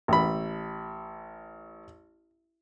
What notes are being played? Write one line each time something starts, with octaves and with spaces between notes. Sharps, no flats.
A1 B5